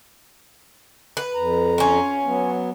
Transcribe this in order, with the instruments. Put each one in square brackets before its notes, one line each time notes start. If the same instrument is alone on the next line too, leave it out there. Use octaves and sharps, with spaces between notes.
[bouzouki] B4
[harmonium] F2 A#5
[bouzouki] C#4 F4
[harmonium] F#3 B3